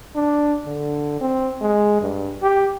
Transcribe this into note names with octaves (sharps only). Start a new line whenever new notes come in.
D4
D3
C4
G#3
G2
G4